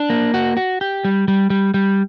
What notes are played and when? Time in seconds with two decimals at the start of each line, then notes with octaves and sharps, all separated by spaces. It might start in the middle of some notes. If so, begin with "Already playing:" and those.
Already playing: D4
0.10 A#3
0.34 F#4
0.57 F#4
0.81 G4
1.05 G3
1.28 G3
1.50 G3
1.74 G3